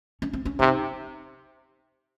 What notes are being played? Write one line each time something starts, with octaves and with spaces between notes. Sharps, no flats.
C#4
C4
C#4
C3 D#4